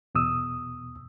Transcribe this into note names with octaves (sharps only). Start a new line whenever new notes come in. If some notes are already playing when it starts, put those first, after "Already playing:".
E2 B2 D#6 E6